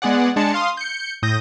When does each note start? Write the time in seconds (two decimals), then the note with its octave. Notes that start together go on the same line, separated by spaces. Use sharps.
0.02 G#3 B3 G#4 D5 F#5
0.36 G#3 D4 A5 C#7
0.54 F5 C6 D#6
0.77 G6 C#7
1.22 A2 D#6 G6 A#6